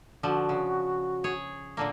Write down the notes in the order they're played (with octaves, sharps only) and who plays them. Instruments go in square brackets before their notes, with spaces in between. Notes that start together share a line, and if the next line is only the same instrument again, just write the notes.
[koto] D3 F3 [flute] F#4
[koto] C#3
G#4 C#5
[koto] A#2 D3 A#3 [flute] A5